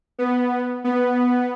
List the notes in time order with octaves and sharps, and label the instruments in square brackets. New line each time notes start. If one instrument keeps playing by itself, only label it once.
[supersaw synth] B3
B3